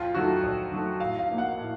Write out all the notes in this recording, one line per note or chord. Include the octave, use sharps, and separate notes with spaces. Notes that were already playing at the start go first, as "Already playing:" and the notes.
Already playing: F2 F4
D#3 F#3 A3 F#4
F2
D#3 F#3 A3
A2 F5
F5
F3 A#3 D#4
F#5
A2